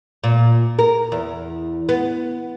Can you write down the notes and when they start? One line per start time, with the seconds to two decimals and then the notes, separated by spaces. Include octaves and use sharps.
0.24 A#2
0.79 A#4
1.12 E2
1.89 B3